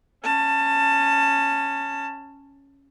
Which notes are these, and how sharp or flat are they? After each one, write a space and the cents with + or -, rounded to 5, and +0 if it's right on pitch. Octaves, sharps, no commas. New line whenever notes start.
C#4 +0 A5 +20